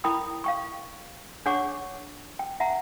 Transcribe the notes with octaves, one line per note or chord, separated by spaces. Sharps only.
E4 A#4 G5 B5 D#6
F5 G5 C#6
D4 G#4 C#5 F#5 C#6 D6
G5
E5 F#5 A#5